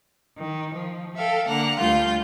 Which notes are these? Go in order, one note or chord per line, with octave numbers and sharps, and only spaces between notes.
D#3
F3
A4 E5 F5 G5
D3 A#3 F#5 A#5
D2 G3 A3 F4 F5 G6